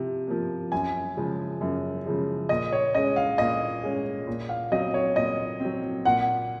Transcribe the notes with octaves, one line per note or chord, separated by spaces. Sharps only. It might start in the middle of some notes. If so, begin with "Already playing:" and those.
Already playing: C3 F3
F3 A#3
F#2 G#5
C#3 F3 G#3
F#2
C#3 F3 G#3
A#2 D#5
C#5
G#3 C#4 D#5
F5
A#2 D#5
G#3 C#4
A#2
F5
F#3 C4 D#5
C#5
A#2 D#5
F#3 C4
A#2 F#5